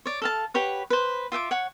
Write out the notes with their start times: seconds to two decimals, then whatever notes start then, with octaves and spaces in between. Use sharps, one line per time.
0.06 C#5 D5
0.22 A4 F5 A5
0.54 G4 B4 C#5 F#5
0.90 B4 C5
1.32 F4 E5 G5 D6
1.51 C#5 F#5